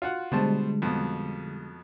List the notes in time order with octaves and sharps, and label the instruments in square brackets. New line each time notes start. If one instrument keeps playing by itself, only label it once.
[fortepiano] F4 F#4 F#5
[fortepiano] B2 C5 A5 [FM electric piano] D3 G3 G#3
[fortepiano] F2 B2